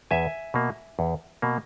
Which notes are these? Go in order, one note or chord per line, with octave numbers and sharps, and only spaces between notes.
E2 E5 G#5
B2 A#3
E2
B2 A#3